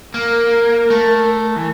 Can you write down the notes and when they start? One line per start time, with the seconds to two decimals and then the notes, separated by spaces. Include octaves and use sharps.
0.14 A#3 A#4
0.90 A3
1.56 E3